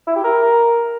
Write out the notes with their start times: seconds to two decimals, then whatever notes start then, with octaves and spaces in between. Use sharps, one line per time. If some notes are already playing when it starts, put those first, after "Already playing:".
0.07 E4
0.16 G4
0.24 A#4